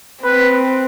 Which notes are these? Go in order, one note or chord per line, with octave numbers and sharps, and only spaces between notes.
C4 B4